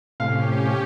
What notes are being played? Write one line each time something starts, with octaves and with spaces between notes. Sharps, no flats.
A2 C3 C#4 G4 F5